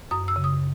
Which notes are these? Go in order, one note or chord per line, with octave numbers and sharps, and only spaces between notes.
F#2 D#6
E6
C#3
D#6